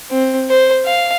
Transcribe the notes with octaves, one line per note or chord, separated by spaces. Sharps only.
C4
C5
F5